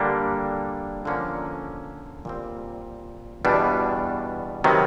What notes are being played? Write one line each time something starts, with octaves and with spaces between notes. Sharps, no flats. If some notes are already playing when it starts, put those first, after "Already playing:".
Already playing: D3 G3 A#3 D4
D3 F3 A#3 C#4
A#2 G3 C4
E2 B2 G3 B3 D4
C3 D#3 F#3 B3